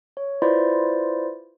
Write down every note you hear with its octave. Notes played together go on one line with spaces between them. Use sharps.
C#5
E4 F4 B4 C5 D5